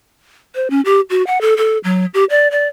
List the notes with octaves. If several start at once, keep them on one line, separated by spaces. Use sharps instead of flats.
C5
C#4
G4
F#4
F#5
A4
A4
F#3
G4
D5
D5